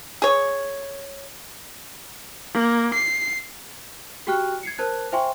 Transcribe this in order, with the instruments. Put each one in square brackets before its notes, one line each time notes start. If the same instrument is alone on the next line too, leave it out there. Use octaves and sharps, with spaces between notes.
[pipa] G#4 C#5
[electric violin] A#3
C7
[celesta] F#4 G4 G5 C#6 F6 F#6
G#6 C7 C#7
A#4 C5 A5 F#6 G#6
C5 E5 G5 G#5 C6 C#6